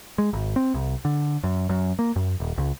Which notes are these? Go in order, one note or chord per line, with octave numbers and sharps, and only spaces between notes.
G#3
G#1
C4
C2
D3
F#2
F#2
A#3
F#2
D#1
C#2